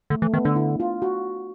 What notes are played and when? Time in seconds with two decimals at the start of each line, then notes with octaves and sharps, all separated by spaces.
0.10 D3 A3
0.22 E3 A3
0.33 D#3 B3
0.45 D3 D4
0.56 E4
0.80 F4
1.02 F#4